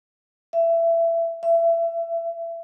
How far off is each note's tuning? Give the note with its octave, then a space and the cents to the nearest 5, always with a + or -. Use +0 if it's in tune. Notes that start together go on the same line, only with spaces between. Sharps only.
E5 +20
E5 +25